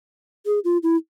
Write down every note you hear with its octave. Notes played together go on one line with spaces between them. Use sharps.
G#4
F4
E4